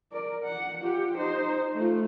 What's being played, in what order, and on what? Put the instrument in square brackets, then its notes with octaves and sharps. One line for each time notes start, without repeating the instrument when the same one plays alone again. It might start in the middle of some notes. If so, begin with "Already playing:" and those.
[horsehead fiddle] A#4 D5
F#5
F4 G4
D#4 C5
A3 F4